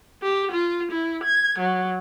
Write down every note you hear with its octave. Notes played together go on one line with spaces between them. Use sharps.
G4
F4
E4
G#6
F#3